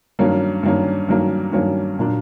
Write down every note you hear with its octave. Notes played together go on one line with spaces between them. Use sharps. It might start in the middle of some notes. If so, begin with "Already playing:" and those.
G2 D#3 F#3 A#3 C#4
G2 D#3 F#3 A#3 C#4
G2 D#3 F#3 A#3 C#4
G2 D#3 F#3 A#3 C#4
A#2 F#3 A#3 D4